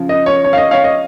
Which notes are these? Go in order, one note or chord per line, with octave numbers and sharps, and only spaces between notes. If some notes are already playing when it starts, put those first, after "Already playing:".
Already playing: C#3 F3
D#5
C#5
C#5
F5
D#5
C#5 F5
D#5